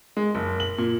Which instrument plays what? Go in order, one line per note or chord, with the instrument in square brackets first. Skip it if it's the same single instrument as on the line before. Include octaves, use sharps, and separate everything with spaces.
[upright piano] G#3
F#1
F#7
A#2